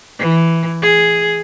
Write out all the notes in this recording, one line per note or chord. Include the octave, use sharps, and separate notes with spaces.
E3
G#4